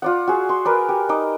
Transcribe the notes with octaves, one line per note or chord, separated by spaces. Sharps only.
F4 D5 F#5
F#4 G#4
C6
A#4 B4 D5
G4
D#4 D#5 D6 D#6